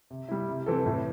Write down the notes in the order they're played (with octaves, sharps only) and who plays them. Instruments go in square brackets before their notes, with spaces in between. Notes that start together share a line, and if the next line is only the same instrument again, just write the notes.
[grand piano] C3
G3 E4
C3
E3 C4 A4
A2